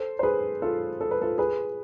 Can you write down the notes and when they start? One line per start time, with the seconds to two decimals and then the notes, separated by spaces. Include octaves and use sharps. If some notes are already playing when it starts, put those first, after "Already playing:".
Already playing: A4 C5
0.19 C5
0.23 G#4 B4
0.62 F4 A4
1.01 A4
1.11 B4
1.21 F4 A4
1.38 G#4 B4